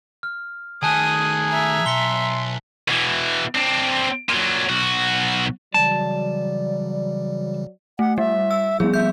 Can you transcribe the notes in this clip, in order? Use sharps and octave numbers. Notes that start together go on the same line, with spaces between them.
F6
D#3 A3 G#4 G#5 A5 D#6 F#6
E5 A#5
B1 C6 B6 C#7 G7
B2 E3
C4 D4
A#2 F#3
B1 F#4
C#3 E3 F#3 G3 D5 A5
A3 F#5
G3 E5
E6
F3 G3 B3 E4 G#4
E5 G6